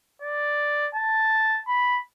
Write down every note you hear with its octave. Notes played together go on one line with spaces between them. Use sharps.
D5
A5
B5